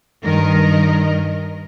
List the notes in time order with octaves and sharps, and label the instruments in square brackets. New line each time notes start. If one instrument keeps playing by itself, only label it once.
[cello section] G2 D#3 A#4 D#5